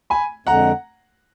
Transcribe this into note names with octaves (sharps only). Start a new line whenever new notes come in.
G#5 B5
F2 D3 G#3 F#5 A#5